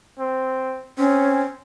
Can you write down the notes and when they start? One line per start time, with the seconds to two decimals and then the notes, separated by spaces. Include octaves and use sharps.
0.19 C4
0.98 C4 C#4